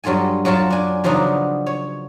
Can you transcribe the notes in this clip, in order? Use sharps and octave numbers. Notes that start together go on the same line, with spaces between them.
G2 F#3 F4 A4 G#5
F#2 F#3 F4 A5
D4 G#5
C#3 F3 F#3 B3 D4 D#4
C#5